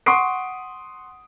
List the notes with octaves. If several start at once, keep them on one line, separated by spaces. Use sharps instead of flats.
F#5 C6 C#6 D#6 C7 D7